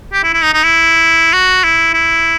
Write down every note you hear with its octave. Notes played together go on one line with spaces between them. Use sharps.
G4
E4
E4
D#4
D#4
E4
F#4
E4
E4